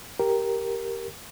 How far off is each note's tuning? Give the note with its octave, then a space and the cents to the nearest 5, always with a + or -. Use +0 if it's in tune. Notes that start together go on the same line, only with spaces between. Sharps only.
G4 +0 A#4 +0